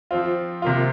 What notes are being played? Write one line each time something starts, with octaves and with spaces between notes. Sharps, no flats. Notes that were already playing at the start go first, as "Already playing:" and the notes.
F3 C4 F4
C3 A#3 F4